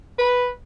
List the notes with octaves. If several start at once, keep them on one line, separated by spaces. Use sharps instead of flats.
B4